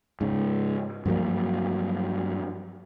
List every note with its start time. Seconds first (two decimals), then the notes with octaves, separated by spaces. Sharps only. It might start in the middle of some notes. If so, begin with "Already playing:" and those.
0.21 G#2 C#3
1.06 G2 F3 F#3 A#3